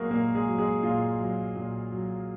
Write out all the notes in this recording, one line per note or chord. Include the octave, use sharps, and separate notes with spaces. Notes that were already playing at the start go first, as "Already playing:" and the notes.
Already playing: A#2 F#3 G#3 A#3 F#4 G#4 A#4
A#2 A#3 A#4
G#3 G#4
F#3
G#3 G#4
A#2 F4
F#3
A#2
F#3